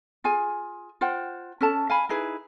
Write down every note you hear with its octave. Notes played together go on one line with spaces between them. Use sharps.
F4 G#4 G#5
F4 C5 F#5 G5
C#4 A4 A5
F5 G#5 B5
D#4 E4 G#4 B4